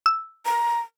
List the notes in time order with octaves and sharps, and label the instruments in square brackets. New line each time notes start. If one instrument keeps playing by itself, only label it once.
[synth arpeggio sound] E6
[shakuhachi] A#5